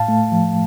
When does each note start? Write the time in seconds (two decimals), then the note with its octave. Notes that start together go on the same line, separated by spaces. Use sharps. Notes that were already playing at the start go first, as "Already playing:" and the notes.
Already playing: A2 F5 A5
0.08 A3
0.32 F3